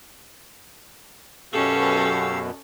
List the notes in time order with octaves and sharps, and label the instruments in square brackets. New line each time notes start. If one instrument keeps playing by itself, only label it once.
[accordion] F#2 B2 [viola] C#4 A4 [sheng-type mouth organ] G4 F5 E6